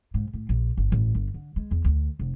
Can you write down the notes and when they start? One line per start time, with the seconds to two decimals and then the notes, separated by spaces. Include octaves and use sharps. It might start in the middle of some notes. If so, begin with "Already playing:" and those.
0.14 G#2
0.33 A2
0.49 A#1
0.77 G1
0.92 A1
1.15 G1
1.34 D3
1.56 G#3
1.71 E2
1.84 D2
2.19 F1